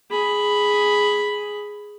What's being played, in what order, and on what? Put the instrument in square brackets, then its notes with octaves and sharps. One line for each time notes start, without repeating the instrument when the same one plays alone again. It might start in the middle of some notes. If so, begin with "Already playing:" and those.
[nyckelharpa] G#4 B5